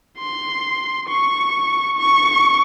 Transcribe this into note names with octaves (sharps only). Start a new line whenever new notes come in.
C6
C#6
C#6